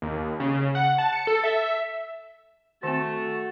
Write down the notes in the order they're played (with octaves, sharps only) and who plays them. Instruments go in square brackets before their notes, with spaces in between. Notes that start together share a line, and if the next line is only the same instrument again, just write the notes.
[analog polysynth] D#2
C#3
F#5
A5
C#7
A4
E5
[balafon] D#3 C4 [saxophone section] A3 [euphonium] F#4 [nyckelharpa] A5